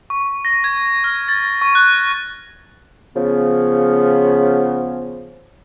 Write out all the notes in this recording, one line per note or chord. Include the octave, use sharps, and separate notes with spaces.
C#6
A#6
G#6
F6
A6
C#6
F#6
C#3 F3 B3